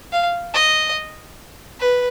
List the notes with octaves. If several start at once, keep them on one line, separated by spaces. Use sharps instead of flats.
F5
D#5
B4